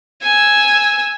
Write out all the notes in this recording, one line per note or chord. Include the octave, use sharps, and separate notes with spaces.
G#5 E6